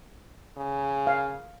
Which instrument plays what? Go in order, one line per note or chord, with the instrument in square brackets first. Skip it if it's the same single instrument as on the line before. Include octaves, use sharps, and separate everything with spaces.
[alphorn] C#3
[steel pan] F5